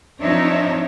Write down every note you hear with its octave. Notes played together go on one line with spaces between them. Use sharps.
F3 C4 D4 D#4 C#5 E5